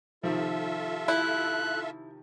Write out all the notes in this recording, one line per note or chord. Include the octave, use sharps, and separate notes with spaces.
C3 D#3 F3 F4 A4 E5
E4 F#6